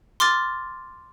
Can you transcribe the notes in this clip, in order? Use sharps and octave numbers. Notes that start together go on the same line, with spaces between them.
C6 D6 F6 A6